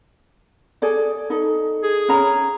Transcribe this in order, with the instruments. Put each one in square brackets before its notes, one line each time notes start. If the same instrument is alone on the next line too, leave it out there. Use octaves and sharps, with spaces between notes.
[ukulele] G#4 A4 D5
D#4 A4
[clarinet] G#4
[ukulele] C#4 A#5